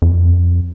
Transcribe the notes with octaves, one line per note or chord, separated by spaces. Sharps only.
F2